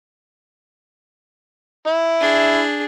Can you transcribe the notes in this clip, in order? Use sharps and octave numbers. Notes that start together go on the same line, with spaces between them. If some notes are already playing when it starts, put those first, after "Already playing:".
E4
D4 G#4